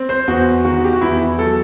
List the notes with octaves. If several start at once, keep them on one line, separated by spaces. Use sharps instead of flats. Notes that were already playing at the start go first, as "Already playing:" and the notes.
Already playing: C4
C5
E2 F#4
D#3 F#4
G4
F#4
E2 E4
F#3 A4